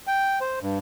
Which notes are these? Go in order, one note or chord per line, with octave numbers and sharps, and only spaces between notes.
G5
C5
G2